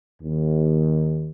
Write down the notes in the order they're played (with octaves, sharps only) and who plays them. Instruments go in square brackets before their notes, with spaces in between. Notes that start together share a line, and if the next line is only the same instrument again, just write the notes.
[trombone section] D#2